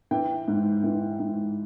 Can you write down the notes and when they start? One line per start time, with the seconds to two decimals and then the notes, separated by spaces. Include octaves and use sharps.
0.11 E3 G5
0.48 G#2
0.84 E3
1.19 G#2